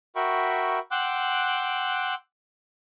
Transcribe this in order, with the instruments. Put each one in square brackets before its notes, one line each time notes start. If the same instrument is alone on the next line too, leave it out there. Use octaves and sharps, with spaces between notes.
[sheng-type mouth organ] F#4 A#4 E5 G5 B5 C#6
F#5 G5 C6 D6 E6 F#6